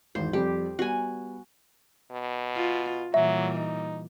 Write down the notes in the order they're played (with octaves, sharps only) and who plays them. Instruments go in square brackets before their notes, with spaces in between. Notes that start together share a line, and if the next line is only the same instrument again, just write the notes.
[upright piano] G#1 E2 [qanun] C5
[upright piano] F2 G3 C4 [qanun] G4
[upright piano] G3 B3 [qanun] F#4 G#5
[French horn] B2
[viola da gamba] F4
[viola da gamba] A#2 E3 G3 [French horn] F#3 [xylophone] E5
[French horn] D#4